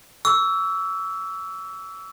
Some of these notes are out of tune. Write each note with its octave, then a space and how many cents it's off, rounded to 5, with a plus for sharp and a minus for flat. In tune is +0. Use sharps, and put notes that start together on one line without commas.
C#6 +45 E6 +0